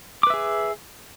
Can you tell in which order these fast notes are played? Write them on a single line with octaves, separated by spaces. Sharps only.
D6 B4 E5 G#4